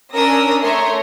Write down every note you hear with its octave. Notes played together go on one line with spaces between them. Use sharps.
C#4 D4 A#4 D#6 E6 A#6
A3 C#5 E5 A#5 C6